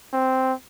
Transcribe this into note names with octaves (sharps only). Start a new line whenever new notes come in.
C4